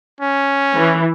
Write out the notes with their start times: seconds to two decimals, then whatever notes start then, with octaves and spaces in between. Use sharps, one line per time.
0.20 C#4
0.75 E3